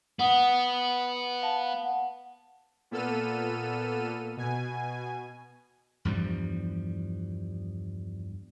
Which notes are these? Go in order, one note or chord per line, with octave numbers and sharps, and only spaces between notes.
B3 F#5 D#6
F5 A5
F#5
A#2 B3 A4 E6 F6 D#7
B2 G#5
E2 G2 F3 G3